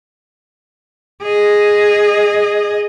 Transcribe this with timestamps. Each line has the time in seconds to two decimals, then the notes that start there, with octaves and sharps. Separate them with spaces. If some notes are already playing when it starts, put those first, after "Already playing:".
1.23 G#4 D#5